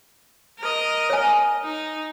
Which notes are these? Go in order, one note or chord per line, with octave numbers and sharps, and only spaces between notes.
A#4 D#5
C#5 G#5
D#4